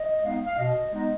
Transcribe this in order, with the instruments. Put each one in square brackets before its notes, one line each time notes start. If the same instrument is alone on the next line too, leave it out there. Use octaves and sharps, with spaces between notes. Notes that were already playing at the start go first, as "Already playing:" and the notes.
Already playing: [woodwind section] D#5
G#3 B3 D#4 F5
F5
B2 D#5
G#3 B3 D#4 D#5